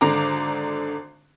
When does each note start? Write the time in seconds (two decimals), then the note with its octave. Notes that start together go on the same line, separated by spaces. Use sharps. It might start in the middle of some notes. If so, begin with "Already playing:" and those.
0.01 G#1 D3 A#5 D6